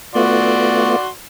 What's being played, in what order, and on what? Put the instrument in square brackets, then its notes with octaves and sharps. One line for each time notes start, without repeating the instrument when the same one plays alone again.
[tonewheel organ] A3 B3 F4 [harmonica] F#4 D5 C6